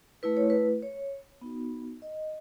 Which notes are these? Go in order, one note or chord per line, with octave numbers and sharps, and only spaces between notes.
A3 E4 B4
C#5
B4
C#5
B3 D#4 F#4
D#5